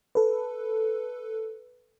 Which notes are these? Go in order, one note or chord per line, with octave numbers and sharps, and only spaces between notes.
A4 B4